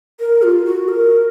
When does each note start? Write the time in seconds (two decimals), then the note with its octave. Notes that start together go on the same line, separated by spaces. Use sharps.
0.20 A#4
0.43 F4
0.65 F#4
0.88 A#4